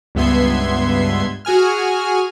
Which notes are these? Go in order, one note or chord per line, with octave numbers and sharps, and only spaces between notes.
C#2 G2 B3 E5 C6 G#6
F#4 G#4 G#5 F6